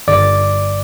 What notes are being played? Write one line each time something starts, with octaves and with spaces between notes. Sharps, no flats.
G1 D5 D6